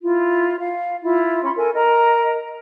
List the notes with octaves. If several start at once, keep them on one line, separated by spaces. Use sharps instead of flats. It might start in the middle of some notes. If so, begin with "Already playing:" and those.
E4 F4
F5
E4 F4
C#4 B5 C6
A4 A#4 G#5
A#4 D#5 A#5